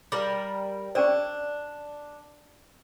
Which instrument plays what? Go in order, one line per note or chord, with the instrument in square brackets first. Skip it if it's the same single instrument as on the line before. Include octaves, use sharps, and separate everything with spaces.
[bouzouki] G3 A#4 [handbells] D6
[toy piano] C#4 A#4 D5 [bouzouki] D4 [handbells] C5 G5 C#6